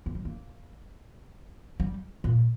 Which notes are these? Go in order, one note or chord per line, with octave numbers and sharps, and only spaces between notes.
A#3
G3
A#3
G3
A#2